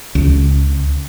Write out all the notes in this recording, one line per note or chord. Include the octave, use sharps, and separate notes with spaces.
C#2